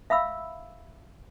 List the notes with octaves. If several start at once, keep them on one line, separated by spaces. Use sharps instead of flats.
E5 F5 B5 E6